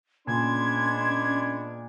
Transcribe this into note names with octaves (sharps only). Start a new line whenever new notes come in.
A#2 G#3 B3 C#4 D4 C6 G#6